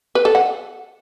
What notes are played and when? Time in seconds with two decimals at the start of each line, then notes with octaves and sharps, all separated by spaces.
0.15 B4
0.25 A4
0.35 F#5